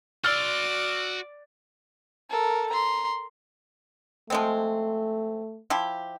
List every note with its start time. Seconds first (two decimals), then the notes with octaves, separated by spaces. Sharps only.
0.24 F#4 D5 C6 E6 F6 A6
2.30 A4 A#4
2.70 A#5 C6
4.30 F3 G#3 A3 C4
5.70 F3 E4 G4